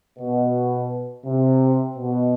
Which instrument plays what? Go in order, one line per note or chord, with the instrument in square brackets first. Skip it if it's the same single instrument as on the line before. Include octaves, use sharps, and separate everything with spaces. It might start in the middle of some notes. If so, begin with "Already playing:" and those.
[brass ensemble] B2
C3
B2